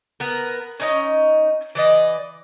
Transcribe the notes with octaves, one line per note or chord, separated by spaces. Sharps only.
B3 A#4
C#4 D#4 D#5
E3 D5 D#5